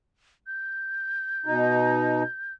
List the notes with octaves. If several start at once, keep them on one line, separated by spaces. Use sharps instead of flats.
G6
B2 D#4